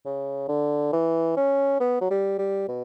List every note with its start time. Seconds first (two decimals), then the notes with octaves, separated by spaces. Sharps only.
0.05 C#3
0.48 D3
0.93 E3
1.37 C#4
1.80 B3
2.01 F#3
2.10 G3
2.39 G3
2.68 B2